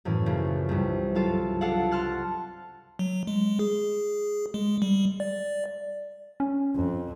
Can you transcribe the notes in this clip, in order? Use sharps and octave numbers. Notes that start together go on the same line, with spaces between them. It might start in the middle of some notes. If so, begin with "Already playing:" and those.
F#2 A2 E3
A#1 C#3
C2 G2
F#3 F4 A4
D4 A4 F5 F#5
A5 C6 F6 F#6 A6
F#3
G#3
G#4
G#3
G3
D5
C#4
F2